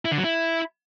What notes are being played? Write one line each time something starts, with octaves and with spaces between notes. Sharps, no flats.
E4
D3
F#3
E4